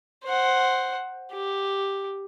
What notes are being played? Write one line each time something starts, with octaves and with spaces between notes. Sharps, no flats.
C5 F#5
G4